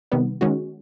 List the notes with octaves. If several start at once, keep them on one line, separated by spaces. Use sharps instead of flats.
C3 D#3 G3 B3
D#3 G#3 C#4 F#4